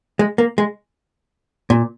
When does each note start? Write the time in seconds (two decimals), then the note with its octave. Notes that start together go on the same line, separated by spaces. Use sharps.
0.19 G#3
0.38 A#3
0.58 G#3
1.70 A#2